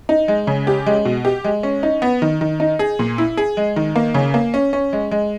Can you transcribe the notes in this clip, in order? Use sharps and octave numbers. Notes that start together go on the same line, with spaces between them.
D#4
G#3
C#3
G4
G#3
B2
G4
G#3
C#4
D#4
B3
D#3
D#3
D#4
G#4
A#2
E4
G#4
G#3
D#3
A#3
C#3
A#3
C#4
C#4
G#3
G#3